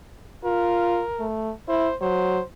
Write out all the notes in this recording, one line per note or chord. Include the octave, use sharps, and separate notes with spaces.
F4 A#4
A3
E4 C5
F#3 C5